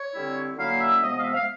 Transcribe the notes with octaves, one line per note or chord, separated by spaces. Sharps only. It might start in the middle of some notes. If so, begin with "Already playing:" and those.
Already playing: C#5
D3 G3 C4 E4
D3 F#3 A#3 C#4 E4 F5
E5
C3 F3 G#3 B3 D#5
D#5
F5
E5
F5